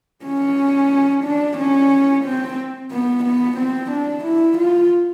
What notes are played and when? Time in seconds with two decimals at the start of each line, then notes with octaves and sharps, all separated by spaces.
0.24 C#4
1.24 D4
1.58 C#4
2.24 C4
2.91 B3
3.25 B3
3.57 C4
3.91 D4
4.25 E4
4.58 F4